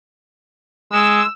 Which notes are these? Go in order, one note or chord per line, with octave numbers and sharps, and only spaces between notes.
G#3 E6